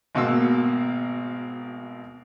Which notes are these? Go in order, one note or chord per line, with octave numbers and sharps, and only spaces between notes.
G#1 B2 A#3 E6